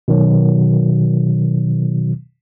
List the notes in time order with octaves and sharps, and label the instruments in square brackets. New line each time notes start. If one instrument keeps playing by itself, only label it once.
[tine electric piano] B2 D#3 F#3